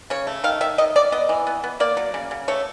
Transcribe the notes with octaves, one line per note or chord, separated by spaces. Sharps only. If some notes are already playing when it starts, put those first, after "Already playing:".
C#3 C#5
A3
D#3 F5
D#3 E5
D#3 D#5
F#3 D5
B3 D#5
E3
B3
B3
A#3 D5
F#3
C#3
C#3
A3 C#5